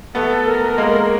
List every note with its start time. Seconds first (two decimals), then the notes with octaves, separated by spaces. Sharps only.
0.15 A3 B3 A4
0.47 A#4
0.78 G#3 A#3